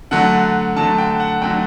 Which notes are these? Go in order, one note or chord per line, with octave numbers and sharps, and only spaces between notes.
D3 F#3 A3 F#5
D3 F#3 A3 A5
G5
F#5
D3 F#3 A3 G5